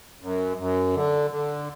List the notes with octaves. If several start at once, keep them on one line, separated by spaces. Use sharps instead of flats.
F#2
F#2
D3
D3